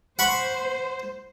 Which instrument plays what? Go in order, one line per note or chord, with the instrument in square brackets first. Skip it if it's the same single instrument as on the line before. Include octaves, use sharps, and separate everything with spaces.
[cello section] C5 [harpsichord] F#5 B5 C#6